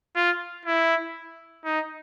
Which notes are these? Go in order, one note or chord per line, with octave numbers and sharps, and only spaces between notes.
F4
E4
D#4